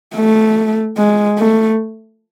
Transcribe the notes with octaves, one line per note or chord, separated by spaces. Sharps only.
A3
G#3
A3